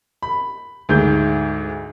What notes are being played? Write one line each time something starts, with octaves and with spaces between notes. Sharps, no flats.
B5
D2 G#2 G6